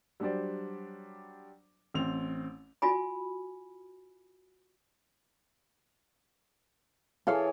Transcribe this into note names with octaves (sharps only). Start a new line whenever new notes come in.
F#3 G3 D4 C5 D5
A1 C4 F7
F4 F#4 G#5 B5
E3 G#4 A4 C#5 F5